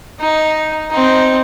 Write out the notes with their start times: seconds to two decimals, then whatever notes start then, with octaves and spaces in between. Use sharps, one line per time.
0.20 D#4
0.90 C4 D#4